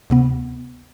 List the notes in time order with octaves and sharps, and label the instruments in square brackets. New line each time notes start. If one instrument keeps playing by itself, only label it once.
[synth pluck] D2 C3 B3